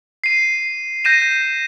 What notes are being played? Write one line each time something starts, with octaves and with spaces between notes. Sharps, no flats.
C7 D#7
G6 A#6 D#7 E7